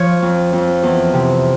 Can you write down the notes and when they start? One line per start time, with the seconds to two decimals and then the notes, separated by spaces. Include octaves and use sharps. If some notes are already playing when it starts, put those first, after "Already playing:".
Already playing: F3 C#5
0.22 F2
0.53 F2
0.83 E2
1.14 C3